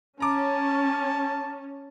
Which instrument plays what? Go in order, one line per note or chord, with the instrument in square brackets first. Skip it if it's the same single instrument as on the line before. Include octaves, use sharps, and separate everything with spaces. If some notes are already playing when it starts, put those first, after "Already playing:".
[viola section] C#4 [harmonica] A5 [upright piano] A#5 D6